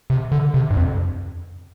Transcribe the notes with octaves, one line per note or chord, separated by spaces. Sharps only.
C3
D3
C3
G2
F2